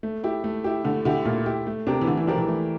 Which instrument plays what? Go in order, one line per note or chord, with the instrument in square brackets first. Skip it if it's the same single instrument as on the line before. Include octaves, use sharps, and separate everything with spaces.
[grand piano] A3
E4 G4
A3
E4 G4
[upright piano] D3 [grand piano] A3
[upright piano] D3 [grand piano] E4 G4
[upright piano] A#2 [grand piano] A3
[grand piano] E4 G4
A3
[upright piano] C3 [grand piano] D4 G4 A#4
[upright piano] E3
[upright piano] D3 [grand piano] A3
[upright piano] E3
[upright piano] F3 [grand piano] D4 G4 A#4
[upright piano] E3
[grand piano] A3